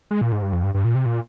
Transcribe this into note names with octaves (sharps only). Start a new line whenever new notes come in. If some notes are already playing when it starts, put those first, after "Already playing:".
G#3
A#2
G#2
G2
F2
G2
G2
A#2
C3
A#2